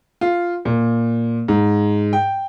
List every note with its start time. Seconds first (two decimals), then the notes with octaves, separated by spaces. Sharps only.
0.21 F4
0.65 A#2
1.48 G#2
2.13 G5